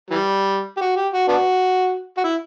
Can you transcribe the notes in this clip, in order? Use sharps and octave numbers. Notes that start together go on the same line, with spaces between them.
E3 G3
G4
F#4
G4
F#4
B3 D4 F#4
F#4
E4